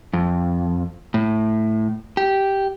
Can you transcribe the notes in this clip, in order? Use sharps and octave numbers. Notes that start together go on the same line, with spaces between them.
F2
A2
G4